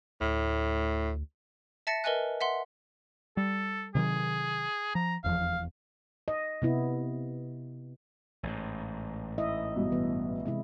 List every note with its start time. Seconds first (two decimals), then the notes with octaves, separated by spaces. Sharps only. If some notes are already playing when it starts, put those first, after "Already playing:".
0.21 D2 A2
1.87 E5 A5 A6 A#6 C#7
2.04 A#4 B4 D#5 E5 G#5 F#6
2.41 E5 F#5 C6
3.37 G3 A4
3.95 C3 D#3 F#3 G#4
4.95 F3 A#5
5.24 F1 E2 F3 F5
6.28 D#5
6.62 C3 B3 E4
8.43 A1 G#2
9.38 E4 D#5 E5
9.76 G2 B2
9.92 E3 B3
10.46 C3 G#3 E4